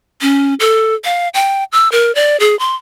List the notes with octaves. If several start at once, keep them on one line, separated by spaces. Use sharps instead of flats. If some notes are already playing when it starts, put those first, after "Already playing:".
C#4
A4
F5
G5
E6
A#4
D5
G#4
C6